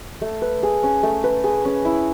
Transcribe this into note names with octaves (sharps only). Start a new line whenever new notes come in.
A3
B4
G#4
C#4
A3
B4
G#4
C#4
E4